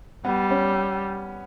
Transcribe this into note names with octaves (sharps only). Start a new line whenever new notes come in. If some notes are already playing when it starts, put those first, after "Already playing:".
G3 B3
C#4